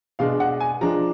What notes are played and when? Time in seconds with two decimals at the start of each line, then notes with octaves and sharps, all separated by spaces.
0.19 B2 G#3 D4 F5
0.40 F#5
0.60 G#5
0.81 F3 G#3 D4 A#5